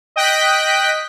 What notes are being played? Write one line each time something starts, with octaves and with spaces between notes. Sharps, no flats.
D#5 G5 F#6 B6